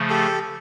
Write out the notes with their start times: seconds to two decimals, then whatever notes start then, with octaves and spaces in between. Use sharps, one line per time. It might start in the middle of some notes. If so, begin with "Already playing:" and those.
Already playing: C#3 F3 A3
0.10 G4 A4